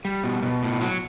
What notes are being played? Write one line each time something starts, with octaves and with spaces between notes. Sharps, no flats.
G3
B2
B2
A2
F#3